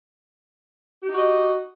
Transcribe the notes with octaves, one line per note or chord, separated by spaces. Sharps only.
D#4 F#4 G4 D#5